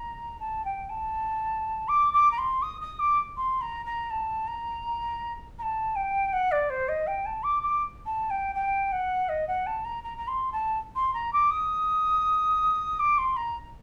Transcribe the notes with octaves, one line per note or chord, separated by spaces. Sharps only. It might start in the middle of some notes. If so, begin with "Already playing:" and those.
Already playing: A#5
A5
G5
A5
D6
D6
A#5
C6
D#6
D#6
D6
C6
A#5
A#5
A5
A#5
A#5
A5
G5
F#5
D5
C5
D#5
G5
A5
D6
D6
A5
G5
G5
F#5
D#5
F#5
A5
A#5
A#5
A#5
C6
A5
C6
A#5
D6
D#6
D6
C6
A#5